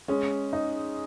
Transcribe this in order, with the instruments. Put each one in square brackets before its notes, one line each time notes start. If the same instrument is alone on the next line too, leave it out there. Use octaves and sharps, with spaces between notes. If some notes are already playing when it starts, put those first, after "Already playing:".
[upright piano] G#3 [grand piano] C#4
[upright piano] D#4